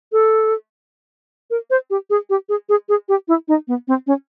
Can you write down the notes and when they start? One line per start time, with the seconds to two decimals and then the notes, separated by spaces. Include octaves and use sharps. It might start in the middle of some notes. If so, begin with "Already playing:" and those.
0.12 A4
1.50 A#4
1.70 C5
1.90 G4
2.10 G#4
2.30 G4
2.49 G#4
2.69 G#4
2.89 G#4
3.09 G4
3.28 E4
3.48 D#4
3.68 B3
3.88 C4
4.07 C#4